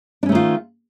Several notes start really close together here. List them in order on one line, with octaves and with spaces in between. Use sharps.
D4 C#4 A3 D#3 F4